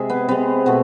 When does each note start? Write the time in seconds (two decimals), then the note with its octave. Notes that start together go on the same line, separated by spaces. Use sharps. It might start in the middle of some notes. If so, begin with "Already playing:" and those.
Already playing: C3 G#3 G#4 E5
0.10 B3
0.29 C3 G#3 B3
0.66 B2 A3